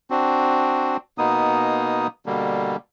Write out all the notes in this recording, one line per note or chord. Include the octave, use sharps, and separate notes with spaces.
C4 D4 F#4
B2 A#3 B3 D#4 D#6
B2 D3 G3 A#3